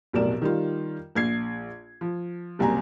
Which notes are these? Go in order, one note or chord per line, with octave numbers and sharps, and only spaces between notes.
F1 B1 A2 A#4 D5 E7
D#3 G3 F4
A#1 G#6 C7
F3
F#1 C2 C4 G#5 A#5